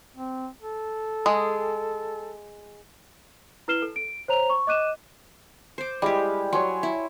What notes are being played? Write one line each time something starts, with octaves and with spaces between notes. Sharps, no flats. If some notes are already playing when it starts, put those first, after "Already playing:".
C4
A4
G#3 G#4
E4 B4 F6 C7 E7 G7
A4
D7
C5 C#5 A#5 F7
C#6
D#5 D6 F#6 D#7 E7
C5 D6
G3 G#3 E4 G4 D6
F#3 C#5 G#5 C6
E4